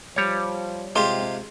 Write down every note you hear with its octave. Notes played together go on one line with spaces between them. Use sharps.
F3 G3 C#5
C3 G#3 F4 G4 C6